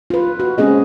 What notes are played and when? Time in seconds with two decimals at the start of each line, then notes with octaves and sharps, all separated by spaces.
0.10 F4 B4
0.40 F#4
0.58 G#3 C4 C#4 G#4 D#5